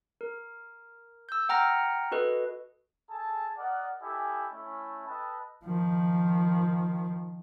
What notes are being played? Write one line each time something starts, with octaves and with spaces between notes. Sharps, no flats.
A#4
E6 G6
F#5 G5 A#5 F6 A#6 C#7
F#4 A4 B4 D#5
G#4 A4 G#5 A5
A#4 D5 D#5 F#5
E4 G4 A4 D#5 G#5
A3 C#4 E4
A4 B4 D#5 G5 A5 B5
D#3 F3